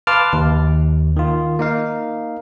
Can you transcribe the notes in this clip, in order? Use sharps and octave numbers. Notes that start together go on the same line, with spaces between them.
B4 F5 A5 C6 D6 F6
D#2
D#3 F4
A#3 D#4 F5